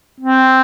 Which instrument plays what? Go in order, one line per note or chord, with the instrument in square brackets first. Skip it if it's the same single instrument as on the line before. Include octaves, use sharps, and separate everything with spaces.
[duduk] C4